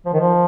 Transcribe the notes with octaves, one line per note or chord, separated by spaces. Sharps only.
F3
D#3
F3